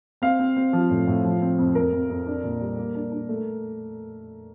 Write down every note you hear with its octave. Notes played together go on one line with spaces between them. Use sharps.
C4 F5
C4
C4
F3
A2
A2
F3
C4
F2
F2 A#4
F2
F2
D4
A#2
G3
A#3
D4
D4
A3